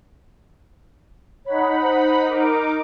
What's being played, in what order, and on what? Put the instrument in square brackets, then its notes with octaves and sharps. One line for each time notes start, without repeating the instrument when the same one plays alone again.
[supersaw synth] D#4 F#5 B5 [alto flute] C#5
[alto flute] C5
[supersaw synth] D#4 A#4 D6